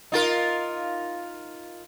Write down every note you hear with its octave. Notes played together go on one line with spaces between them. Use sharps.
D#4 F4 A#4